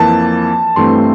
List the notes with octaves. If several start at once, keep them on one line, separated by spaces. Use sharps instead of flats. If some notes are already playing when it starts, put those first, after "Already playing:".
Already playing: F2 E3 A#3 A5
G2 E3 A3 C4 C6